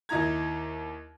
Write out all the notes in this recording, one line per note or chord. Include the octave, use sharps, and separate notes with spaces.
D#2 D#4 E4 A#5 G#6